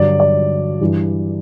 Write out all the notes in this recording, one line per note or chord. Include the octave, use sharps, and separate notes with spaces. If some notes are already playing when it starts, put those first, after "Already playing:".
Already playing: G2 D3 F#3 D5
D5
G2 E3